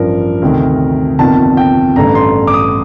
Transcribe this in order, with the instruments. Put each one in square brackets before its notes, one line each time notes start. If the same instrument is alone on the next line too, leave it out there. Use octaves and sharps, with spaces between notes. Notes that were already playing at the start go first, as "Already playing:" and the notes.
Already playing: [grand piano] A1 G2 F3 A#4
D2 C3 D#3
G1 F2 C3 D#3 A5
G5
A1 G2 D3 A3 A#5
C6
D6
D#6